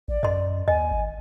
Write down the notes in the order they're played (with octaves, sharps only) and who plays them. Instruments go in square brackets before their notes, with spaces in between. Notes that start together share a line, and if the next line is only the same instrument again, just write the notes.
[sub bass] A1 [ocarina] D5
[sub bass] F#2 [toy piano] D#5 C6
[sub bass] D#2 [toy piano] D#5 [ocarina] G#5
[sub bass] G#1